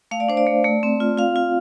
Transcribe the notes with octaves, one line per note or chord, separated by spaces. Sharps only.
A3 F5
D5
D4 C5
D5
A3
A3
C4
F4
F4 F5
F4